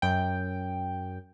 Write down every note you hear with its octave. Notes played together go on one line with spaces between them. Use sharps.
F#2 G5